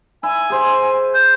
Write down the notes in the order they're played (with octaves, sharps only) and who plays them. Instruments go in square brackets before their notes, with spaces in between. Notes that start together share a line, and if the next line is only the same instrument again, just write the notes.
[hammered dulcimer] E4 [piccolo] G#5
[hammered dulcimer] G#4 C5
[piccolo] G6